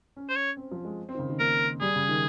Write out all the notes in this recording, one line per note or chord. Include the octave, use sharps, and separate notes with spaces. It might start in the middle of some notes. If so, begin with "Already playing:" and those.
C#4
C5
C#5
C4
F3
G#3
C4
D#3
C#3
D#3
A#3 A#4
G3 G#4
C#3
D#3